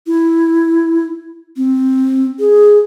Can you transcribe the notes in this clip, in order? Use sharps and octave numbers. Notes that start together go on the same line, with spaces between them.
E4
C4
G#4